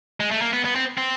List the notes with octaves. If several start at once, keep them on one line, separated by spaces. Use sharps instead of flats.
G#3
A3
A#3
B3
B3
C4
C4